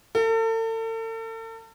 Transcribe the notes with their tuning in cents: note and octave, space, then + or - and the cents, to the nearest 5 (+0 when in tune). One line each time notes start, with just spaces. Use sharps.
A4 +40